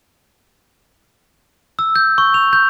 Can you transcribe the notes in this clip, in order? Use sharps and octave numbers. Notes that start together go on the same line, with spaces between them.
E6
G6
C#6
F7
G6